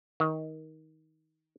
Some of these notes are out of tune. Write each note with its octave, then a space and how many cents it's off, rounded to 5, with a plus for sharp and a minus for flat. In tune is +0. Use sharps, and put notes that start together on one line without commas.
D#3 +20